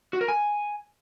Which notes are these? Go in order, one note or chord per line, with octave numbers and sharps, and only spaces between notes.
F#4
A#4
G#5